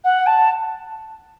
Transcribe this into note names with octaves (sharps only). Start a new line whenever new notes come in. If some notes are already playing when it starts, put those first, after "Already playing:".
F#5
A5